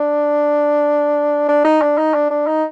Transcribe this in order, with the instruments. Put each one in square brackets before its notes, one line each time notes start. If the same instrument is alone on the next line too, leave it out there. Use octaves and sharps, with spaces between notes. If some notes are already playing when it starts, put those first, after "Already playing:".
Already playing: [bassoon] D4
D4
D#4
D4
D#4
D4
D4
D#4